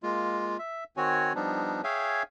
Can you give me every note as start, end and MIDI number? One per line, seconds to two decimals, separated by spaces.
0.03 0.57 56
0.03 0.57 58
0.03 0.57 65
0.59 0.84 76
0.97 1.33 51
0.97 1.33 60
0.97 1.33 66
0.97 1.33 73
0.97 1.33 80
1.35 1.81 53
1.35 1.81 55
1.35 1.81 59
1.35 1.81 62
1.35 1.81 63
1.84 2.23 68
1.84 2.23 73
1.84 2.23 76
1.84 2.23 77
1.84 2.23 79
1.84 2.23 80